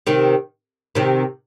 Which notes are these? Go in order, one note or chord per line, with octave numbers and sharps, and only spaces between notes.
C3 D#3
C3 D#3